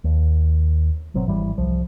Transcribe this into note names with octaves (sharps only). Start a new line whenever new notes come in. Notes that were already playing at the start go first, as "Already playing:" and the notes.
D#2
G#1 B2 F#3 C4
G#1 E3 G3
C2 F3